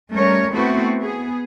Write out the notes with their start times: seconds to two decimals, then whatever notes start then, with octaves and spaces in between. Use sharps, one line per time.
0.12 G3 A3 C#4 A#4 C#5
0.53 A3 B3 C4 E4 F#4
0.99 B3 G#4